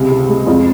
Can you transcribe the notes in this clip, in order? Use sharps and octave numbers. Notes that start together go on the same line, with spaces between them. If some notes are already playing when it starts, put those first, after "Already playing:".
Already playing: C#2 C3
C3
G#3
F2 F4